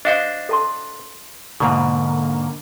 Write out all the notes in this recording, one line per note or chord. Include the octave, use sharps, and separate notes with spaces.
D4 F#4 C5 D#5 F5 D#6
A4 A5 C6
G#2 B2 D3 A#3